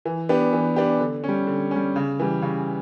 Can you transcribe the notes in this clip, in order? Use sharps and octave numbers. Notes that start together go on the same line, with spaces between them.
E3
B3 D4 G4
E3
B3 D4 G4
D3
G3 C#4
D3
C#4
G3
C#3
E3 G3
C#3